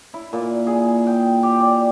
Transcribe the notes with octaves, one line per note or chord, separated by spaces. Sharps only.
E4
A#2
G#4
G5
G4
D5